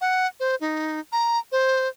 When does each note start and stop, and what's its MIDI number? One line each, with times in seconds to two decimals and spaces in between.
0.01 0.27 78
0.40 0.55 72
0.61 1.00 63
1.12 1.39 82
1.52 1.88 72